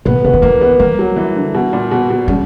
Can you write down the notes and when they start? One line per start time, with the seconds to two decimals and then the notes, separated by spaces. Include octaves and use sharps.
0.05 A#2 B3
0.25 C#3 B3
0.33 D3
0.42 E3 A#3
0.61 B3
0.79 G3 A#3
0.99 F#3
1.16 E3
1.36 D3
1.54 B2
1.73 A#2
1.91 B2
2.10 B2
2.28 C#3 G3